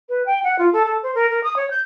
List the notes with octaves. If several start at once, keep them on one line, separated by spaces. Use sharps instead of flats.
B4
G5
F#5
F4
A4
A4
C5
A#4
A#4
D#6
C#5
G6